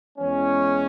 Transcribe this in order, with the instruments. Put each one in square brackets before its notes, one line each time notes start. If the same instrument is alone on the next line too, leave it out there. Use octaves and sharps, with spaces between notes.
[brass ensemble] E2 E3 G#3 C#4